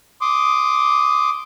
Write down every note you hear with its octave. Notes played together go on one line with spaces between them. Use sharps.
C6 D6 D#6